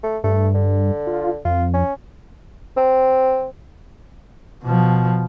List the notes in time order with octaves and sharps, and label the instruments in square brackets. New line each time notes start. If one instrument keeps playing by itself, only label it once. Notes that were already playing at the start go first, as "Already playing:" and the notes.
[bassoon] A3
[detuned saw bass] G2 [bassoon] A3
[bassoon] D3
[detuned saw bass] F4
[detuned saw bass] F2 [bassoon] F4
[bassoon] C#4
C4
[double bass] B2 F3